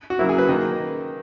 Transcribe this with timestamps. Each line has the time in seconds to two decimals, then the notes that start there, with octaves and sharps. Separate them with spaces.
0.10 F#4
0.19 C#3 F#3 A#3 E4
0.29 G#4
0.38 B4
0.49 D#3 A#3 D#5